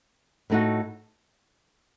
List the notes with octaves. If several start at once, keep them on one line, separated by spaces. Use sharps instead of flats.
A2 A3 D#4 F#4